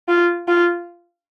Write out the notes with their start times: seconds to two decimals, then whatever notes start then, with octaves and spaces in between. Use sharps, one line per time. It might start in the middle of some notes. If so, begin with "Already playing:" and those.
0.08 F4
0.48 F4